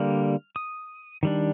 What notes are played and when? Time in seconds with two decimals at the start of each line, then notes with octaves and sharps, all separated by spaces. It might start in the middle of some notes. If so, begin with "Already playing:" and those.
Already playing: D3 G3 A#3 F6
0.56 D#6
1.23 D#3 G3 D4